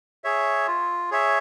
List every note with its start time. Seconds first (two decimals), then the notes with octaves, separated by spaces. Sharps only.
0.24 G#4 C#5 E5
0.67 F4
1.11 G#4 C#5 E5